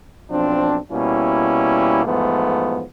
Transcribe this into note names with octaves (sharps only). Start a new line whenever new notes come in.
B1 F3 C4 D4
B2 G3 A#3 C#4 E4
E2 G#2 F3 A3 B3